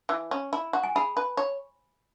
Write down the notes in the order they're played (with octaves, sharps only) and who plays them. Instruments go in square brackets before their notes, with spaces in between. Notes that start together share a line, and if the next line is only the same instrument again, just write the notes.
[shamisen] E3
C#4
E4
F#4
[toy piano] G#5
[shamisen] G#4 [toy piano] B5
[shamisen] B4
C#5